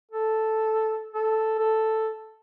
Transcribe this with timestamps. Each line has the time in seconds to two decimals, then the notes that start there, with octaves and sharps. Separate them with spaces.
0.11 A4
1.14 A4
1.59 A4